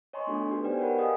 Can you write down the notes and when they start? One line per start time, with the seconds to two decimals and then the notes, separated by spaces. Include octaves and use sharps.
0.13 C#5 D#5 G#5 A#5 C6 C#6
0.27 A3 B3 D4 F#4 A4
0.49 D#4 F#4 G4 B4
0.63 B3 G4 C5 D5 G5 G#5
0.79 A#4 B4 C#5 F#5 B5
0.98 G#4 D#5 F5 G5 G#5 D#6